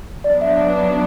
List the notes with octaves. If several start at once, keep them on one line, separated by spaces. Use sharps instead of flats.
F#3 B3 D4 D5
E5